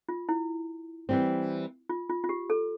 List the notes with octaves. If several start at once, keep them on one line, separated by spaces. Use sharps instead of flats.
F4
E4
E3 G3 C4
F4
F4
F4
G4
A4